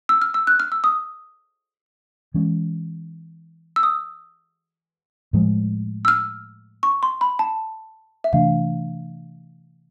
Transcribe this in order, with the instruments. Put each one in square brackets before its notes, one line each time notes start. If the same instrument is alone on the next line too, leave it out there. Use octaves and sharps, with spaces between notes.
[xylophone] E6
F6
E6
F#6
F6
E6
D#6
[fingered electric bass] E3 G#3 C#4
[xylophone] E6
D#6
[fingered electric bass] A2 F3 G#3
[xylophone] E6
F6
C#6
C6
B5
A5
E5
[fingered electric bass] C3 E3 A3 D4 [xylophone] F5